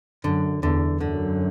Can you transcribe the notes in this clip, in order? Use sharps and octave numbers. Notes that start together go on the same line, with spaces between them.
F#2 D3
E2 D3
F#2 D3